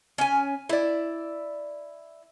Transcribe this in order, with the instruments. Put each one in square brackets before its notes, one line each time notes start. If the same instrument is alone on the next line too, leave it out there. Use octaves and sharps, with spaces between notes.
[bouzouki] C#4 G#5
E4 D5